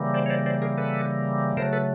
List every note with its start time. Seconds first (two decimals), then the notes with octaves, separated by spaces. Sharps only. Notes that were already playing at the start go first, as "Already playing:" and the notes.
Already playing: C#3 E3 G3 A#3
0.14 C5 D5
0.26 C#5
0.30 C5 D5
0.46 C5 D5
0.62 G#4 A#4
0.78 A4 B4
1.57 C#3 F#3 A3 A#4 C5
1.73 A4 B4